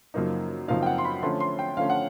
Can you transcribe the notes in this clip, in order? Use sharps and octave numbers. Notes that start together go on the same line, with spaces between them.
F#2 C#3 F3 A#3 D#4
F#2 C#3 F3 A#3 D#4 F5
G5
F#5
C6
B5
D3 F3 A3 C#4 C6
C6
G5
D3 F3 A3 C#4 F5
F#5